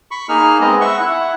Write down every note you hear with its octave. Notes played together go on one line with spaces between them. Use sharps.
B5 C#6
A#3 D#4 G#4 F6
G#3 B3 C4 D#5
E5 F#5 C#6
E4 F#5